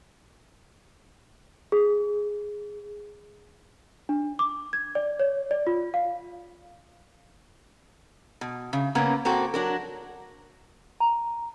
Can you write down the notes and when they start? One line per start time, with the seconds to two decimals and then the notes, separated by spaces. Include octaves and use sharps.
1.72 G#4
4.09 D4
4.39 D6
4.73 G#6
4.95 D5
5.19 C#5
5.51 D5
5.67 F4
5.94 F5
8.41 B2
8.73 C#3
8.95 C#3 A#3 B3 C#4
9.25 A#3 C4 F#4 A4
9.54 F#3 D4 A#4
11.00 A#5